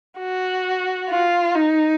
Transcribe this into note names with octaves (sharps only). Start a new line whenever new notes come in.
F#4
F4
D#4